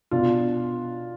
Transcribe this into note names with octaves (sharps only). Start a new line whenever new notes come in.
B2 D4 F4